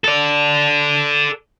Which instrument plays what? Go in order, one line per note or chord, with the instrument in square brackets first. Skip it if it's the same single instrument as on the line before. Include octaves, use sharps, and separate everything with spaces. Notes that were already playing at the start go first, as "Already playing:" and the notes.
[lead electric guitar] A4 D5